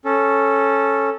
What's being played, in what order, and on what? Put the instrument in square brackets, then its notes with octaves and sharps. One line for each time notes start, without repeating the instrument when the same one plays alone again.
[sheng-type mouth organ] C#4 A4